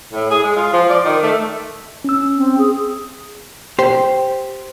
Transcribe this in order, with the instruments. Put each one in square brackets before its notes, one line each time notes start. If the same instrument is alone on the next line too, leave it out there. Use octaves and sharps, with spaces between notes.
[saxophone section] A2
G#4
G#3
F4
F3
D5
D#3
A3
[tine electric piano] C#4 E6
[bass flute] C4
G#4
[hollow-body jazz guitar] G4 C5